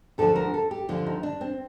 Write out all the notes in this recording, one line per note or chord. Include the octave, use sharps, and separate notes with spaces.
D2 D3 F3 A4
A#4
A4
G4
D2 D3 F3 F4
D#4
D4
C4